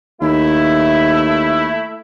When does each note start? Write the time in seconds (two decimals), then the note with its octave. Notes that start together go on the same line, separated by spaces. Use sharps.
0.21 D#2 A3 E4